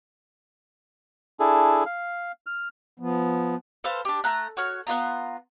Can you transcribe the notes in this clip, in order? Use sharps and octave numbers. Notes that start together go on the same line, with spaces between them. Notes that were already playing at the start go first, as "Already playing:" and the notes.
D4 E4 G#4 A4
F5
F6
F3 B3
A4 B4 C5 F5
D4 G4
A3 A#5 F#6
F#4 C#5 F6
B3 D#4 F4 A#5